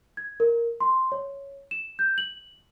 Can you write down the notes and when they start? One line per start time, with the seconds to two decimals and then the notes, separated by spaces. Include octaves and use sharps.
0.17 G#6
0.40 A#4
0.80 C6
1.12 C#5
1.71 E7
1.99 G6
2.18 F#7